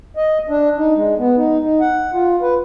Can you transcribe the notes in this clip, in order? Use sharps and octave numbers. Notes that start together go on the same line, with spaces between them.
D#5
D4
D#4
G#3
B3
D#4
D#4
F#5
F4
B4